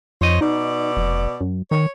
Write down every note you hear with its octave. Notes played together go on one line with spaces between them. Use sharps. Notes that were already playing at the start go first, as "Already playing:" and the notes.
F2 C5 C#5 D#5
B2 D#4 D5
F1
F#2
D#3 C#5